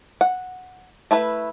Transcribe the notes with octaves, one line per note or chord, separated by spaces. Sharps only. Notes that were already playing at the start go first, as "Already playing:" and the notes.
F#5
A3 E4 B4